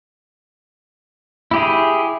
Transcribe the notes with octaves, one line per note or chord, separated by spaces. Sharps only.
E4 G4 G#4